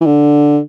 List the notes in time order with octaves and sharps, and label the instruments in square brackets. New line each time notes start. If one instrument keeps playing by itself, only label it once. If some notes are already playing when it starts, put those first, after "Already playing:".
[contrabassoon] E3
D3